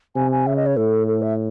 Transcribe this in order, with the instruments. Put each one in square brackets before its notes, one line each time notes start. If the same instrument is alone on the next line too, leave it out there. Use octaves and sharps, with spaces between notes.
[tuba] C3 [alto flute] G#5
[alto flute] G#5
[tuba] C#3 [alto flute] E5
[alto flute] D#5
C#5
[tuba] A2 [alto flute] A4
[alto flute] A4
E5